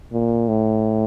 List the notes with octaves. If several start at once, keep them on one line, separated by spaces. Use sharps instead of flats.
A#2
A2